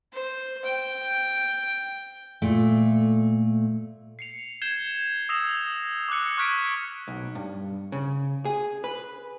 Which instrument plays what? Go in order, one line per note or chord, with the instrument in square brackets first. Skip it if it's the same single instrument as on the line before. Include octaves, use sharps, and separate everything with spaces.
[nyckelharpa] C5
G5
[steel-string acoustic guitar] A#2 A3
[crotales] C7 C#7 F7
G6 G#6 C7 E7 G7
D#6 E6 A#6 C7 E7 F7
D6 E6 F#6 C#7
C#6 F6 F#6 G#6 B6 D7
[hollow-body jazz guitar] B1
G2
C#3
G#4
B4